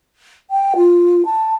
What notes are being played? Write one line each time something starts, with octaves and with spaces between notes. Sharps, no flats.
G5
F4
A5